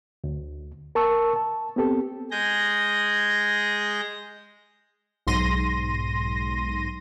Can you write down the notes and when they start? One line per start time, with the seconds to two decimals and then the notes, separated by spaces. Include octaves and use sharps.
0.24 D2
0.95 A#4 A5 C#6 E6
1.36 A5
1.76 B3 C4 G4 A4
2.31 G#3 G#4 G6 A#6
5.27 B1 G#2 C6 A#6 D#7